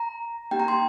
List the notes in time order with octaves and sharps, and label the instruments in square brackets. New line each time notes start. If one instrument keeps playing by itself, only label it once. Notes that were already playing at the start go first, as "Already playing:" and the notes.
Already playing: [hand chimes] A#5
A#3 D#4 G4 G5
A#5
C6